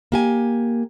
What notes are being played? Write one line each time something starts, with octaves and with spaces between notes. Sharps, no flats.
A#3 G4 G#5